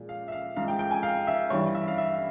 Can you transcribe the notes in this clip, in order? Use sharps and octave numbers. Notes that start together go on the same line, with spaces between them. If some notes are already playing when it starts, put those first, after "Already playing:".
Already playing: A#2 F3 G#3
F5
E5
F5
G#2 F3 G#3 F5
G5
G5
G#5
F5
E5
G2 E3 G3 C#5
E5
F5
E5